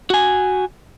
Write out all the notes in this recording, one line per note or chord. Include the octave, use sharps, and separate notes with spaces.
F#4 G#5